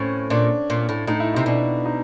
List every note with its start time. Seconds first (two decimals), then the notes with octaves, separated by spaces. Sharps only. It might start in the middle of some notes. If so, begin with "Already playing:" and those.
Already playing: A2 C4 C#4
0.30 A#2 D4
0.70 A#2
0.89 A2
1.07 A2 D#4
1.20 E4
1.34 C3 D#4
1.46 B2 D4
1.86 D#4